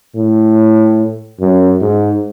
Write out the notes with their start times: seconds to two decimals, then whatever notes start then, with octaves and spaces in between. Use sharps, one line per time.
0.15 A2
1.40 F#2
1.81 G#2